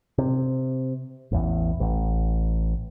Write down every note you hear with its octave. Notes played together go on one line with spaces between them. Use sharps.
C3
A1 E2
A1